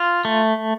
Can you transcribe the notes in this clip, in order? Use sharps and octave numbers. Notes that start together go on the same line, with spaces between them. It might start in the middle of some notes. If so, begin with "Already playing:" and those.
Already playing: F4
A3